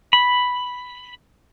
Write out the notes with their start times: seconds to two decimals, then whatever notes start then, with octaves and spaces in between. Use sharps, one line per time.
0.13 B5